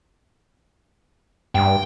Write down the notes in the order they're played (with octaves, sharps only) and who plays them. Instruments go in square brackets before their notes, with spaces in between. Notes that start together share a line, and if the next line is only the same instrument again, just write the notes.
[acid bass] G2 [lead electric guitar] G5